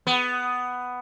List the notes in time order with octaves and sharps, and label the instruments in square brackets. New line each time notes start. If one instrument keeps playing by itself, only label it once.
[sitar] B3